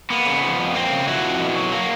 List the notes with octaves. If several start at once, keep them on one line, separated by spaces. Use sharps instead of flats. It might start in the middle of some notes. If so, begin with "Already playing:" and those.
A#3 B3
C#3
F3
F2
A#3 C4
C#3
F3 E4 F#4
F2
B2
F#3
A#3